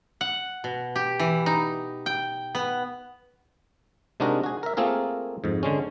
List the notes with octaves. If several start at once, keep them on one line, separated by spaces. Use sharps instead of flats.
F#5
B2
G4
E3
D#4
G5
B3
C3 G#3 D4 D#4 F#4 A#4
F#4 G#4
A#4 E5
A3 A#3 C4 F4 G#4 A#4
F2 G#2
D3 G#3 C#4